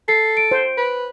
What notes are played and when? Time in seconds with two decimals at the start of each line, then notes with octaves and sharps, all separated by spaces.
0.08 A4 C7
0.37 D7
0.51 C5
0.77 B4